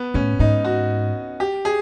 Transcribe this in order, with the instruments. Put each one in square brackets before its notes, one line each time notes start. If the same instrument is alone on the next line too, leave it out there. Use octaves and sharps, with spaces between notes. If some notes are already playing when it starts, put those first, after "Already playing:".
Already playing: [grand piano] B3
[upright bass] A2 [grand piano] C#4
[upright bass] G#2 [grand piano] D#4
[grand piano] F#4
G4
G#4